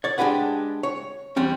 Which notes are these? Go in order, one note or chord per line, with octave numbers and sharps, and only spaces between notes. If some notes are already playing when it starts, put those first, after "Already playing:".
C#5 D5
G#3 D4 G4 B4 F#5
C#5
E2 G3 C4 C#4